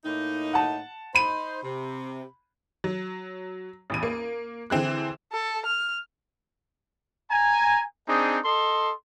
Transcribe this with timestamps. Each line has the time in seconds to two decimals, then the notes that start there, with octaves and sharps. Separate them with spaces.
0.05 A2 A#3 D#4
0.53 F#5 A5
1.15 D#4 C5 B5 D#7
1.63 C3
2.84 F#3
3.90 A1 E2 D#7
4.03 A#3
4.70 D3 E3 C4 G#4 F#6
5.33 A4
5.66 F6
7.31 G#5 A#5
8.08 C4 D4 D#4 G#4
8.45 A4 D#5 C6